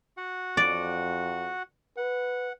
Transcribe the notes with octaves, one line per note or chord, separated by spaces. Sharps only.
F#4 F#5
F2 D5
B4 F#5